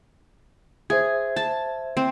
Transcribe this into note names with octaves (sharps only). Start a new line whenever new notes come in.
G#4 C5 E5 G#6
A5
C4